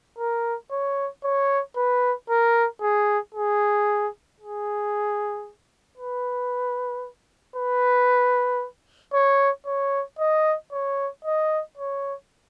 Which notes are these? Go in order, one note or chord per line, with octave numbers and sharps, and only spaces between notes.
A#4
C#5
C#5
B4
A#4
G#4
G#4
G#4
B4
B4
C#5
C#5
D#5
C#5
D#5
C#5